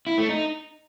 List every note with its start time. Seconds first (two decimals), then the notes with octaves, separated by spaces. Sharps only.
0.07 E4
0.18 A3
0.29 D#4